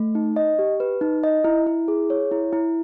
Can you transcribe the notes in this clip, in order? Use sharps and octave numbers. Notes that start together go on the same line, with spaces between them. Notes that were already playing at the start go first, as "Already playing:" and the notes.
Already playing: A3
D#4
D#5
G4
B4
D#4
D#5
E4
E4
G#4
C#5
E4
E4